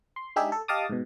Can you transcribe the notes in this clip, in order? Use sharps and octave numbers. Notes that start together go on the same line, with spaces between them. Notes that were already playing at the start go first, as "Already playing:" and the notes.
C6
G#3 D4 D#4 G4 G#4 E5
A4
G4 D#5 F5 A5 D6 D#6
G#2 B2